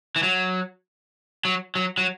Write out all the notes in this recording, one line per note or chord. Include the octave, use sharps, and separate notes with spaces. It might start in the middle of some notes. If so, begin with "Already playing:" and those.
E3
F#3
F#3
F#3
F#3